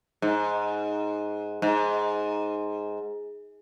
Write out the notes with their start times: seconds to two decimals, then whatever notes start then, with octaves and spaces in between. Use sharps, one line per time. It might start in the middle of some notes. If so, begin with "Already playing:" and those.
0.22 G#2
1.62 G#2